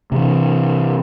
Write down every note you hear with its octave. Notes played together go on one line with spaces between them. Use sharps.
C3 E3